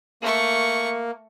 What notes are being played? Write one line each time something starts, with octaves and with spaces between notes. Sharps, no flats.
A3 A#3 C#6